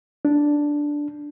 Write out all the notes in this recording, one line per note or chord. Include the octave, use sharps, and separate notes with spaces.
D4